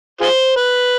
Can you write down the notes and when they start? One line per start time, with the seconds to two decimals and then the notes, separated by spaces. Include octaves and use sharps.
0.21 F4 G#4 C5
0.56 B4